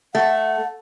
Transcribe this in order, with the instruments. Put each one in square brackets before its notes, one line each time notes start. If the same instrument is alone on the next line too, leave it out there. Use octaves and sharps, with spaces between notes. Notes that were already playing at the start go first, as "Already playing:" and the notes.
[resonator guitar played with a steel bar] A3 [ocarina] F#5